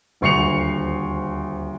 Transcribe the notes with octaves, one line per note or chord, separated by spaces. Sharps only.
D#1 D2 C#6 C7 C#7 F7